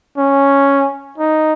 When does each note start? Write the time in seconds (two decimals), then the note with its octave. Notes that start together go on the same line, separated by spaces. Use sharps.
0.18 C#4
1.18 D#4